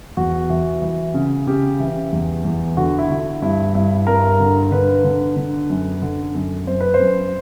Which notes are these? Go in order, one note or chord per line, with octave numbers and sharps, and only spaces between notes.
E2 F#4
E3
E3
C#3
C#3 G4
E3
E2
E2
D3 F#4
E4
D3
E4
G2 E4
G2 E4
G2 A#4
D3
D3 B4
D3
D3
F#2
D3
F#2
F#2 C5
B4
C5
F#2